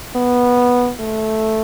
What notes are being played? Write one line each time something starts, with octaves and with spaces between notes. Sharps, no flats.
B3
A3